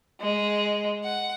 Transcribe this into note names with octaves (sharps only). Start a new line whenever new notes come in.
G#3
F#5